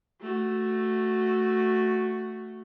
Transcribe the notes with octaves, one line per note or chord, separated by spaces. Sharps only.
A3 F#4